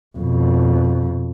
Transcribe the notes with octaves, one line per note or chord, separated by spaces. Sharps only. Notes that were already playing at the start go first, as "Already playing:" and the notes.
F2 B2